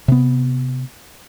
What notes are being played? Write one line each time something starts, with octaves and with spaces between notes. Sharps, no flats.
C3 B3